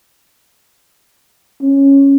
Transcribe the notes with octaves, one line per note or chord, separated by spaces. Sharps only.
C#4